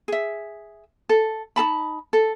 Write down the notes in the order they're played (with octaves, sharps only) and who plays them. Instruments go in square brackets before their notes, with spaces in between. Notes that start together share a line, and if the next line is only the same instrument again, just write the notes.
[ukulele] G#4 E5
A4
D#4 G#4 A5 B5
A4